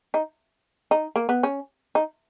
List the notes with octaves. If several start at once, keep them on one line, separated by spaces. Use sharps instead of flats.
D#4
D#4
A#3
B3
C#4
D#4